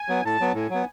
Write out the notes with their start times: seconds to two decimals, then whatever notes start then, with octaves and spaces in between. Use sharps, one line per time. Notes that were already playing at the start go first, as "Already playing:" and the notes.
Already playing: G#5
0.08 F#3 B3
0.24 A2 A5
0.40 F#3 B3
0.55 A2 G#5
0.70 F#3 B3